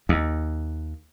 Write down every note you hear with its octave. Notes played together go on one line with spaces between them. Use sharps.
D#2